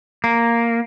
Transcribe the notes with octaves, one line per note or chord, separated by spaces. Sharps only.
A#3